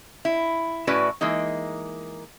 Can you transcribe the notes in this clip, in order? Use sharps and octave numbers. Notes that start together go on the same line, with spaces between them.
E4
A2 C#4 E4 F#4 B4 D5
E3 G#3 A#3 D#4